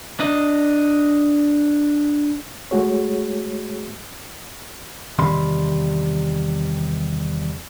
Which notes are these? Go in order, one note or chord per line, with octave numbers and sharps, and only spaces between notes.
D4 D#5
G#3 A3 F#4 G#4 C#5
E2 C3 D#3 G3 B5 C6